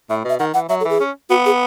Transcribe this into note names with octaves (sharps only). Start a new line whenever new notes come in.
A2 E5
B2
E5
D#3 F#5
E3 F#5
F#3 E5
A4
E3
G#4
C#4
B3 F#4
G#4